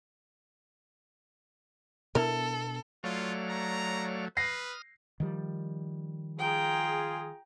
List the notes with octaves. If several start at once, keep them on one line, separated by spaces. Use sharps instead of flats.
B2 B3 D4 E4 A4 A#4
F#3 A3 F4 C#5 D5 F5
A#5
B4 D#6 F6 A#6 C7
D#3 F3 G3
F4 G#4 G5 A#5